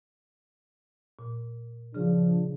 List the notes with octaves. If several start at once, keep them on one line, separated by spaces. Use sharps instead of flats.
A#2
C#3 F3 D4 G#4